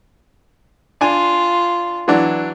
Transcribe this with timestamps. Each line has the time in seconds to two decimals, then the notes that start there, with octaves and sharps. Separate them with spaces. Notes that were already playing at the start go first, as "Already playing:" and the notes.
1.01 D4 F4 G#5
2.08 E3 F#3 D4